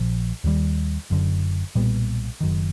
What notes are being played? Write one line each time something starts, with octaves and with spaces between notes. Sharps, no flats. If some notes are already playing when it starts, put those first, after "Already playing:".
Already playing: A#1 A#2 F3
D#2 D#3 G3
F#1 F#2 D3
B1 A#2 G3 B3
F#1 F#2 D#3